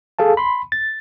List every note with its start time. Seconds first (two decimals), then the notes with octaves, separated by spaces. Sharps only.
0.19 G#4 A4 F5 A5
0.37 B5 C6
0.72 A6